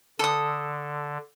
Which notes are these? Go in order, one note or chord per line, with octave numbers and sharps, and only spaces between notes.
D3 A4 D#6